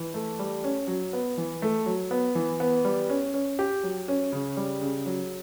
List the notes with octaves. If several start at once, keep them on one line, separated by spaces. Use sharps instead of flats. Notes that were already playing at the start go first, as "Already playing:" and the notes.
Already playing: E3
A3
G3
C#4
F#3
B3
E3
A3
F#3
B3
E3
B3
G3
C#4
C#4
G4
F#3
C#4
C#3
G3
C#3
F#3